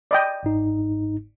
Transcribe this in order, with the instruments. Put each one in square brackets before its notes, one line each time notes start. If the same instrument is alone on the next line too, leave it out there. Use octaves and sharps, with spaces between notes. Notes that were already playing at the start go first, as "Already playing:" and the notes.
[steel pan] D5 D#5 G5
[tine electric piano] G1 G#2 D#4